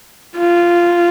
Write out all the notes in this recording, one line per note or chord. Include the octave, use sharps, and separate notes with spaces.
F4